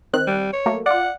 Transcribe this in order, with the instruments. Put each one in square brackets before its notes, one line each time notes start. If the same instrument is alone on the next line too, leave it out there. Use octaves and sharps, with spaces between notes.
[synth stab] D#3 C4 F#6
[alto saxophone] G3
C#5
[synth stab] F#3 A3 A#3
[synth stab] F4 D5 [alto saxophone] F#5